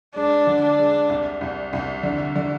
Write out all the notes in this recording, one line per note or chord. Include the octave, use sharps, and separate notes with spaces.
G#3 D4
D3
D4
G#3
C2
C2
C2
D3
D3